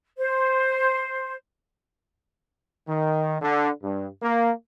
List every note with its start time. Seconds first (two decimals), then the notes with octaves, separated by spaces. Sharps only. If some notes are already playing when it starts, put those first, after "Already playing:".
0.18 C5
2.87 D#3
3.42 D3
3.82 G2
4.22 A#3